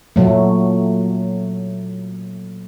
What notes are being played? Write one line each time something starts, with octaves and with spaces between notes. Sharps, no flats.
A#2 F#3 A3